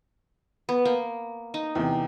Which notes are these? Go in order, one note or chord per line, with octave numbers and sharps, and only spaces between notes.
B3
A#3
D#4
E2 C3 G5